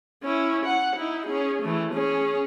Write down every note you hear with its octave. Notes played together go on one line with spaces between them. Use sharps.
C#4 E4
F#5
D#4 E4
C#4 G#4
E3 A3
C#4 G#4